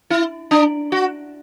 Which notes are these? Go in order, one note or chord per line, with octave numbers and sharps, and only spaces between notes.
E4
D4
F#4